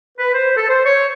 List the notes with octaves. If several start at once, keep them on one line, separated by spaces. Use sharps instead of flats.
B4
C5
A4
C5
C#5